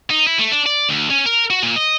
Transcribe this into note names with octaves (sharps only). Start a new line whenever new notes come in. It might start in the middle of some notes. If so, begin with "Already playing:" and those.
D#4
E4
A3
D4
D5
D2
C#4
A#4
F#4
A#2
D#5